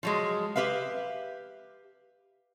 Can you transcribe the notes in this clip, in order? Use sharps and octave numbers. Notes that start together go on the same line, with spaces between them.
F3 F#3 G#3
G4 B4 E5 F5